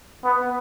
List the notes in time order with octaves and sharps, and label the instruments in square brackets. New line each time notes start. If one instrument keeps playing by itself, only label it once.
[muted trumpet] B3